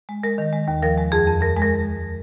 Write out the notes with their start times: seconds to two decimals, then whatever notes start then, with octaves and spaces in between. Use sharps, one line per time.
0.09 G#3
0.23 G#3 A#4
0.38 D#3
0.53 G#3
0.68 D#2
0.82 F3 A#4
0.97 G#3
1.12 F2 G#4
1.27 F2
1.42 F2 A#4
1.57 G#3
1.62 A#4